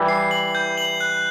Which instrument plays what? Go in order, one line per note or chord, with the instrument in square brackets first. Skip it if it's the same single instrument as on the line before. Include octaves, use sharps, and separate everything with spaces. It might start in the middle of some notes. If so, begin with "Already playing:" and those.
Already playing: [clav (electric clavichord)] E3 G3
[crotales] C7
F#7
G6
F#7
F#6